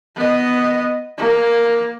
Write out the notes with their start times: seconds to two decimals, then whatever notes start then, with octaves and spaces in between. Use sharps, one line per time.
0.16 B3 D#5
1.18 A#3